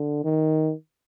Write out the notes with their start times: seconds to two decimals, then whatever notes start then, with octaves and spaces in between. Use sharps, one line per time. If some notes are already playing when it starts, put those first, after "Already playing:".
Already playing: D3
0.24 D#3